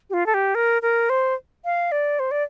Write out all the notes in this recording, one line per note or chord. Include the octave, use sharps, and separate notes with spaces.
G4
F4
A4
G4
A#4
A#4
C5
F5
D5
C5
D5